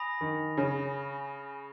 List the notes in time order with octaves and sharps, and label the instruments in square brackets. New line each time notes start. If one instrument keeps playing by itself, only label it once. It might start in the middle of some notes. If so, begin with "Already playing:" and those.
Already playing: [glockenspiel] G#5 B5 D#6 A#6 F7
[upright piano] D#3
C#3